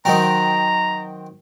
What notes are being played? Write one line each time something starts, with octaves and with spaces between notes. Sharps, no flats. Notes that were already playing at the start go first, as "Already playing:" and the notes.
D#3 F#3 C4 A#5